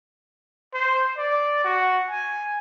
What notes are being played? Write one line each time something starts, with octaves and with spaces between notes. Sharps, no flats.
C5
D5
F#4
G#5